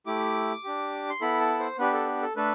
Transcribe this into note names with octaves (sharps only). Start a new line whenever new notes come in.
A3 E4 G4 D6
D4 G4
C6
B3 E4 A4 B5
A5
C5
B3 D4 G4 B4
A4
A4
A3 D4 A4 B4